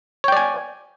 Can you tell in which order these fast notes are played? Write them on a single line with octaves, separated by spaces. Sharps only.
C#5 G5 D5 G#5